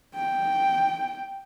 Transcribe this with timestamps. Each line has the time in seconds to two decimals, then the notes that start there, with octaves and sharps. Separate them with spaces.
0.15 G5